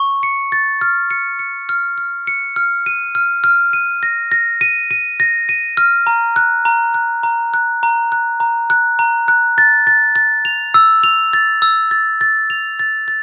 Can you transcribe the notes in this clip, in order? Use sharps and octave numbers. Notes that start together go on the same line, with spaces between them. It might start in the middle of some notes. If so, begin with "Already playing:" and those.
Already playing: C#6
C#7
A6
F6
C#7
C#7
F6
F6
C#7
F6
D#7
F6
F6
D#7
A#6
A#6
D#7
D#7
A#6
D#7
F6
A#5
F#6
A#5
F#6
A#5
F#6
A#5
F#6
A#5
F#6
A#5
F#6
A6
A6
A6
F7
E6
F7
A6
E6
A6
A6
F7
A6
A6